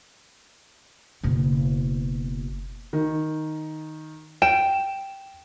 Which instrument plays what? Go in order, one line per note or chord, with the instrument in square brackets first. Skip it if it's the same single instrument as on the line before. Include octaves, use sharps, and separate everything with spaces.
[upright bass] F#1 B2
[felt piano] D#3
[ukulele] G5 [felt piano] E7